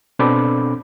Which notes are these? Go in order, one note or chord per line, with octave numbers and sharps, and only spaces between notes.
B2 C4 D4 A4 B5 D6